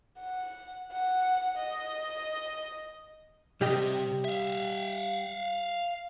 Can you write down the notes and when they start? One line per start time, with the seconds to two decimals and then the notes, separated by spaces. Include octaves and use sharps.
0.19 F#5
0.93 F#5
1.58 D#5
3.61 C3 G3 G4 D#5
4.25 E5 F5